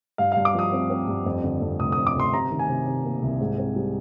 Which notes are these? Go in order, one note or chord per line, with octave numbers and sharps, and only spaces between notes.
G2 F5
G2 F5
D6
F3 D#6
C4
C4
G2
F2
D3
F2
F1 D#6
D#6
F2
D6
F1 C6
C3 A#5
D#3
G#5
C3
C3
A#3
C2
G#2
C4
G3